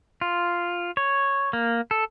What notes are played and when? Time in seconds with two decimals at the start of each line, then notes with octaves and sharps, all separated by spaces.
0.21 F4
0.97 C#5
1.53 A#3
1.91 A4